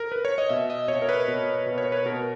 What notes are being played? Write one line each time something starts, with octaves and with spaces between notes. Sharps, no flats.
A#4
B4
C#5
D#5
B2 E5
D#5
B2 C#5
A#4
B4
B2
B2
C#5
B4
B2 A#4